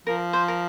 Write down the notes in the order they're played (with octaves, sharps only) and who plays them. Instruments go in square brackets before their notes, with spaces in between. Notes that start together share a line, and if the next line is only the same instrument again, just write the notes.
[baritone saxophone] F3 [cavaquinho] A#4
[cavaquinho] C5
A#4